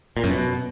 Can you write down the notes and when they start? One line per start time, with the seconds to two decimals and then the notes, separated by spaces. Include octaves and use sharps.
0.17 A#2
0.24 F#2
0.31 B2